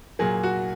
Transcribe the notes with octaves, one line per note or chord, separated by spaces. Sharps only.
A#2 F#3 A#3 G#4
F#4